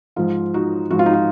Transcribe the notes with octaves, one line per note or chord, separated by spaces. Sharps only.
G#2 F3 F4
D#4 F#4
G#2 F3 F#4
F4
D#4
F4